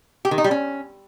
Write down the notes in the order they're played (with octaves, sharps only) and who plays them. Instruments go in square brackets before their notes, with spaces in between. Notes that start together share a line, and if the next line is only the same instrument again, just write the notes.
[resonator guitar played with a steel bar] G4
D#3
D#4
G3
C#4